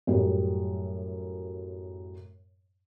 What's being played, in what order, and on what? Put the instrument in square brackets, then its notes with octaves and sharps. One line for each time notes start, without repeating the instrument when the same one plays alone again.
[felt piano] F#2 A2 F#3 G3